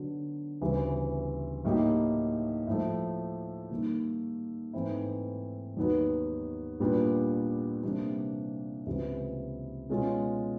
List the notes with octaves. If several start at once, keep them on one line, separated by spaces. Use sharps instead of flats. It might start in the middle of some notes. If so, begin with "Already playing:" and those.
Already playing: D3 F#3 B3
D2 C#3 E3 G3 B3
A2 F#3 A#3 D#4 G4
A2 F3 A3
D#3 G3 A#3
G#2 E3 A3 C4 E4
D#2 D#3 F#3 B3
A#2 G3 B3 D4 F4
C3 E3 G3 A#3 D4
C#2 C3 E3 G#3 B3
B2 G#3 C#4 F4